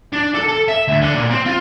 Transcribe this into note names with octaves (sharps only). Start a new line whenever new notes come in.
D4
A4
A4
E5
D2
D3
A#2
C4
F4